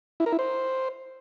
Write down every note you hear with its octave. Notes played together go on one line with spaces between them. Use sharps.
E4
A#4
E4
C5